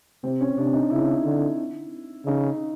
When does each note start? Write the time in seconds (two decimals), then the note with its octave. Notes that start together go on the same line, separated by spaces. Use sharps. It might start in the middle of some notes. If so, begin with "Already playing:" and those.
0.24 C3 C4
0.41 C#4
0.57 C3 D4
0.74 D#4
0.90 C#3 E4
1.25 D3
2.26 C#3 D#4